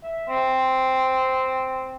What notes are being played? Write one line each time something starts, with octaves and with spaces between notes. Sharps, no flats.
E5
C4